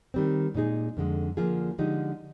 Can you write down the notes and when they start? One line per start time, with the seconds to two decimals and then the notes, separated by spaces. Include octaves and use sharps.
0.14 D#3 G3 C4
0.55 A#2 G#3 D#4 G#4
0.97 F2 D3 G#3
1.37 D3 F3 A#3 F4 G#4
1.78 D3 F3 G#3 D#4 G4